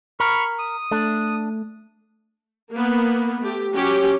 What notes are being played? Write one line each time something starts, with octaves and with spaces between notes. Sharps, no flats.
A#4 B5 C#6 F6
D#6
A3 D4
A#3 B3
A3 G4
F#3 C#4 G4